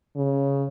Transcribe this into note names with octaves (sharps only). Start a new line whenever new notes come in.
C#3